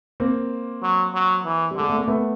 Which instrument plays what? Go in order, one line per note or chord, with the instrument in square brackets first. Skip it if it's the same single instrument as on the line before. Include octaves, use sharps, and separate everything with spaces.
[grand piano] A#3 C4
[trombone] F#3
F#3
E3
[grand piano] G3
[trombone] D3 [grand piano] G#3
[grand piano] A3
A#3
A3 B3